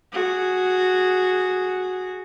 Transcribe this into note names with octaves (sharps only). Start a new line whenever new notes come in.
F#4 G#4